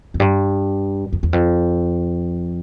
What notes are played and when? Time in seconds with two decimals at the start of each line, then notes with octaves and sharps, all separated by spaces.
0.14 F2
0.20 G2
1.13 F2
1.23 E2
1.33 F2